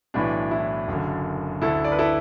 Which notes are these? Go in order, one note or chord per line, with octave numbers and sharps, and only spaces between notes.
B1 A2 E3 D4
E4
F#1 F#2 D3
D2 D3 E4 A4
D5
B4
E4 A4